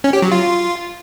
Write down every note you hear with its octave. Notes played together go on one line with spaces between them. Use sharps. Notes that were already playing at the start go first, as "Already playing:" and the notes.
C#4
G4
F#3
F4